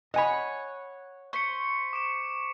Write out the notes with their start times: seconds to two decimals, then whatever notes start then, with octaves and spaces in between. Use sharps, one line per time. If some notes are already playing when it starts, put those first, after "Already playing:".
0.14 C#5 D#5 F#5 G#5 B5
1.33 C5 C#6 B6 C#7
1.93 D6 D7 E7